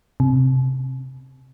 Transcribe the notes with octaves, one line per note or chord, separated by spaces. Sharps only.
C3